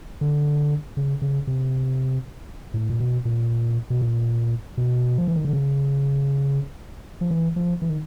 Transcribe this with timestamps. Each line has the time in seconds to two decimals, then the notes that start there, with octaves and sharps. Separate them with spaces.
0.21 D3
0.97 C#3
1.22 C#3
1.47 C3
2.74 A2
2.90 A#2
3.00 B2
3.25 A#2
3.90 B2
4.01 A#2
4.77 B2
5.18 F3
5.28 E3
5.36 D#3
5.45 D3
5.53 C#3
7.21 F3
7.31 E3
7.56 F3
7.82 E3
7.89 D#3